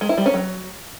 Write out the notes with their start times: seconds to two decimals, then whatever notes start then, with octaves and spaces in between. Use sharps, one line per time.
0.01 G#3
0.09 E4
0.18 G3
0.26 C#4
0.34 F#3